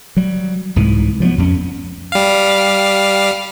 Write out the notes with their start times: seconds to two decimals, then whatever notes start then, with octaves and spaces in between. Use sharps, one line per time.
0.17 F#3 G3
0.76 C2 G#2 E3
1.20 F3 F#3 G#3 B3
1.38 F2 A#3 C#4
2.12 G3 F5